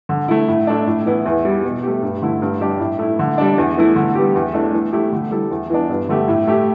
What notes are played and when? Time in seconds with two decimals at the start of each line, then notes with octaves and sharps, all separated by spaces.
0.09 D3
0.28 A3 E4
0.48 A2
0.67 A3 D4
0.87 A2
1.06 E3 B3 E4
1.25 E2
1.45 E3 G3 E4
1.64 B2
1.83 A3 G4
2.02 G2
2.22 D3 A3 E4
2.42 G2
2.60 G3 D4 G4
2.80 A2
2.99 A3 E4
3.19 D3
3.38 G3 D4
3.58 E2
3.77 E3 A3 E4
3.96 D3
4.15 G3 B3 G4
4.35 E2
4.54 E3 A3 D4
4.74 E3
4.92 A3 E4 G4
5.13 D3
5.31 G3 E4 A4
5.51 E2
5.70 E3 B3 D4
5.89 G2
6.09 D3 A3 G4
6.28 A2
6.47 A3 G4